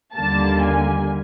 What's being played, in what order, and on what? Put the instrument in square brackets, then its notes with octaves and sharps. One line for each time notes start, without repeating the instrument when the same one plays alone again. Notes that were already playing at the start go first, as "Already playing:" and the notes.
[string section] D#2 D3 G3 A#3 A5
G#5